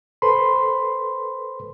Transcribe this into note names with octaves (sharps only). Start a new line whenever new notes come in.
A4 B4 C5 B5 C6